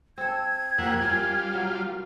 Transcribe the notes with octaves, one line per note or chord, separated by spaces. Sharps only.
C4 A4 G#6
F2 A#3 G4 E5 F#5
G3 C#4 F4 A#4
B2 F#3 A#3